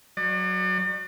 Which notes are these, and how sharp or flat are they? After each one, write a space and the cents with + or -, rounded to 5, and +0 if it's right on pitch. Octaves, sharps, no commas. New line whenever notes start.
F#3 +0 D5 +40